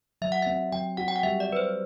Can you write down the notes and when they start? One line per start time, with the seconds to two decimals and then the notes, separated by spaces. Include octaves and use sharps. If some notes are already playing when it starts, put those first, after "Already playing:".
0.22 F#3 E5
0.32 F#5
0.42 C4 E5
0.72 F#3 G5
0.97 F#4 F#5
1.08 G5
1.16 F#5
1.23 G3 E5
1.40 D5
1.49 G3 B4
1.57 C5